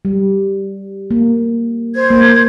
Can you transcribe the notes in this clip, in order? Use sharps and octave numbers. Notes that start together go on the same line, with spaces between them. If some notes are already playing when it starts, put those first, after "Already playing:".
G3
A#3
C5 G#6
A#3